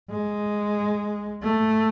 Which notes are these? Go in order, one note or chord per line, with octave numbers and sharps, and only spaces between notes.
G#3
A3